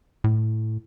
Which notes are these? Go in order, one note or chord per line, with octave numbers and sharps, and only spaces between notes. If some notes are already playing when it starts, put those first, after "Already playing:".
A2